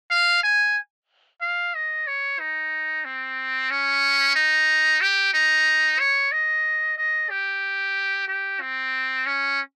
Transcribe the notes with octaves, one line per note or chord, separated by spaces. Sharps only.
F5
G#5
F5
D#5
C#5
D#4
C4
C#4
D#4
G4
D#4
C#5
D#5
D#5
G4
G4
C4
C#4